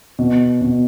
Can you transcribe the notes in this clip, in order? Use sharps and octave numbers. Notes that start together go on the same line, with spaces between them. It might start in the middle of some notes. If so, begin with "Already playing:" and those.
B2
B2